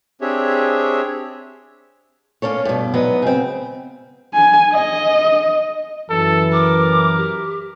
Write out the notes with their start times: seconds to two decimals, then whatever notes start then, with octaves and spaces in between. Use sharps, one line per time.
0.21 C4 D4 G4 G#4 C#5 E5
2.42 A#3 C#4 A4 C#5
2.65 G2 B2
2.94 G#2 F#3 B3 D#5
3.22 C#3 C4
4.34 G#5
4.73 D#5
6.10 F#2 E3 A4
6.52 A#4 D6
7.17 G4